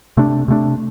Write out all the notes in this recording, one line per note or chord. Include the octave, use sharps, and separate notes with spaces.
C3 A3 D4
C3 A3 D4